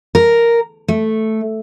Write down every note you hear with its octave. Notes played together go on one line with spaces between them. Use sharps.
A#4
A3